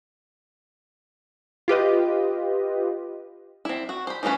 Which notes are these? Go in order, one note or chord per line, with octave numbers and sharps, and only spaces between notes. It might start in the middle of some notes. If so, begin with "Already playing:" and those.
F4 G4 B4 D#5
C4 E4
F#4
C5 B5
E3 F3 A3 C#4 B4